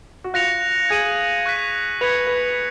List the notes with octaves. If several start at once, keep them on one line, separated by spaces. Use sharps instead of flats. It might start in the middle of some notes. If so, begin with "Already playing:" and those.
F#4
F4 F#6 A#6 C#7 F7
G#4 G#6 D#7 F#7
C#6 F#6 B6 D#7
B4 G#6 C#7 F7
B4